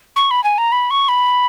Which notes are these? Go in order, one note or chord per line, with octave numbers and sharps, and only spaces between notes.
C#6
B5
G#5
A#5
B5
C#6
B5